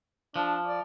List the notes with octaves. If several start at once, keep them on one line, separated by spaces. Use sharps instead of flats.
F3 D4
D5